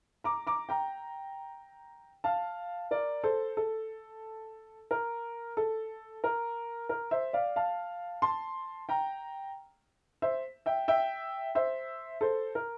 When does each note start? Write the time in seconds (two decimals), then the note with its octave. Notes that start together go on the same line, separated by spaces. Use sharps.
0.24 A#5 D6
0.47 A#5 D6
0.69 G5 A#5
2.24 F5 A5
2.91 A#4 D5
3.24 A4 C5
3.57 A4
4.91 A#4
5.57 A4
6.24 A#4
6.89 A#4
7.11 C5 E5
7.33 D5 F5
7.56 F5 A5
8.22 A5 C6
8.89 G5 A#5
10.22 C5 E5
10.66 E5 G5
10.88 E5 G5
11.55 C5 E5
12.21 A4 C5
12.55 A#4